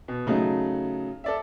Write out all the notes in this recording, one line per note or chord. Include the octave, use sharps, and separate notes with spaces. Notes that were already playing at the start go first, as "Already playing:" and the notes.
B2
C#3 F#3 A3 D#4
A4 D5 E5